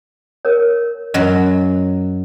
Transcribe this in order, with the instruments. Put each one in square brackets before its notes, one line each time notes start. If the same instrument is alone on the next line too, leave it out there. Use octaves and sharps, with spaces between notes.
[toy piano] A#4 C#5
[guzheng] F#2 F#3 [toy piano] D#5